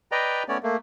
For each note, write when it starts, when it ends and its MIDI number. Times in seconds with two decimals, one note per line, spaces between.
0.12 0.43 71
0.12 0.43 74
0.12 0.43 75
0.12 0.43 79
0.12 0.43 82
0.48 0.57 57
0.48 0.57 59
0.48 0.57 61
0.48 0.57 73
0.48 0.57 74
0.63 0.77 57
0.63 0.77 58